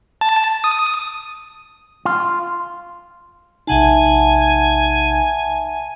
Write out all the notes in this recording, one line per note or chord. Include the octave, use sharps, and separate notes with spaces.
A5
D#6
F4
A#1 C3 D#4 E5 F#5 G#5 A5